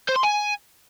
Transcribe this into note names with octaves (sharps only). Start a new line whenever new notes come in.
C5
C6
G#5